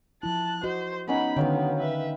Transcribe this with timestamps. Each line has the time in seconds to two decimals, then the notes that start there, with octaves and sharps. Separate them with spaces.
0.23 F3 E4 A5 F#6
0.64 F#4 C5 D#5
1.08 B3 C#4 D#4 F#5 B5
1.37 D3 D#3 F#3 B3 C5 F5 G5
1.79 B4 E5